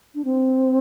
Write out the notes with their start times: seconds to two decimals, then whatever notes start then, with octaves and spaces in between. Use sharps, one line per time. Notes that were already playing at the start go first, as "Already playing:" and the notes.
0.15 D4
0.25 C4